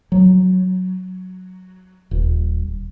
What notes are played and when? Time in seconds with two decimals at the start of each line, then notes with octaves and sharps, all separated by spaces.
0.12 F#3
2.11 D#1